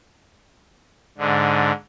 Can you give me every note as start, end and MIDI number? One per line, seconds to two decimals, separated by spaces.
1.18 1.72 44
1.18 1.72 50